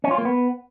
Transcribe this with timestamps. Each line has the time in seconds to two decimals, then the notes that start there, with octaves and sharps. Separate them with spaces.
0.04 C#4
0.11 F4
0.18 A#3
0.25 B3